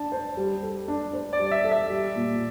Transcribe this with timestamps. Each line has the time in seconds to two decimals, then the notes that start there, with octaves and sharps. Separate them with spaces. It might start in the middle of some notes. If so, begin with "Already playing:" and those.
Already playing: D4 A5
0.12 C5
0.37 G3
0.63 A4
0.88 D4
1.13 C5
1.33 D5
1.39 G3
1.51 E5
1.64 A4
1.71 E5
1.90 G3
2.16 A#2